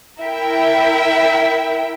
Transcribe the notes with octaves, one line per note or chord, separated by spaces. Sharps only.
E4 A#4 E5 G5